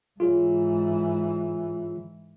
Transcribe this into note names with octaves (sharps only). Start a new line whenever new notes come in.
G#2 E3 F4 G#4 C#5